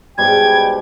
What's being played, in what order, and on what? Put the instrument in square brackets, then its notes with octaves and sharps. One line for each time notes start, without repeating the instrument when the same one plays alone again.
[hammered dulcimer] G#2 B2 G3 [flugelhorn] G5 [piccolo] G#6